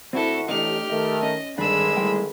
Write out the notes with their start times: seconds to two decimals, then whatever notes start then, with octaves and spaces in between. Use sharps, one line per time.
0.13 D2 C4 D4 E4 F#4 A4
0.49 A1 A3 D4 D#4 G4 F6
0.90 D#3 A3 D#4
1.23 C#4 D#5
1.58 G#1 G2 D3 D#3 G#3 D4 B5 E6
1.97 A2 G3 G5